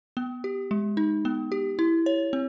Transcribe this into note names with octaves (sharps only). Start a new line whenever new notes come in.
B3
G4
G#3
D#4
B3
G4
E4
C#5
C4